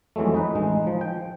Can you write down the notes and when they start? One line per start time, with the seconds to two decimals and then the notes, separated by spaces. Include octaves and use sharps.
0.16 F2 E3 F#3 G#3 A3
0.35 D#4 B4
0.55 A1 G#3 D#4
0.87 F3
1.01 G5